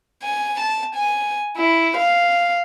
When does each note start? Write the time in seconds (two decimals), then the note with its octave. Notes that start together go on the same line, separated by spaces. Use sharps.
0.22 G#5
0.60 A5
0.95 G#5
1.57 E4
1.97 F5